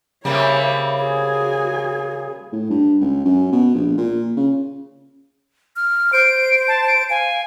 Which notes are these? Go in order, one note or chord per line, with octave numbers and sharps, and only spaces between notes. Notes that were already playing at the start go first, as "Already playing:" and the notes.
C#3 G3 A#3 C4 C#5 E5 B5
F#4 G#4 G#5
A2
G2
C#2
F#2
B2
A#1
A#2
C#3
F6
C5 D7
A5
D7
F5 G#5